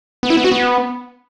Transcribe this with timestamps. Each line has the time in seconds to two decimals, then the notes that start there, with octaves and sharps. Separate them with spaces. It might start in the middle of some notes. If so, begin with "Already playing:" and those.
0.23 B3
0.30 E4
0.37 B3
0.44 F#4
0.52 B3